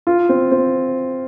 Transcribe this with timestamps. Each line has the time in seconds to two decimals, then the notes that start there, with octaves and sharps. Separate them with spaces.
0.07 F4
0.29 C4
0.51 C4